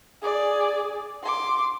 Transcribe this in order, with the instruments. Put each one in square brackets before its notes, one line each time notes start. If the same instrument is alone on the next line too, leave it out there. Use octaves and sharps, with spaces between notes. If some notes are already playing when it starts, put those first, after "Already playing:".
[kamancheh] G#4 D5
C6 D6